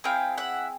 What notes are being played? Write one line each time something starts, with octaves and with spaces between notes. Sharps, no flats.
C4 E4 G#4 F5 G5
E5 F#5